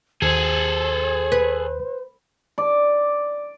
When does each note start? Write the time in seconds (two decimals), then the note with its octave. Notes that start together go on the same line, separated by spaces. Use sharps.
0.22 D#2 G#4 A4 C5
1.32 B4
2.58 D5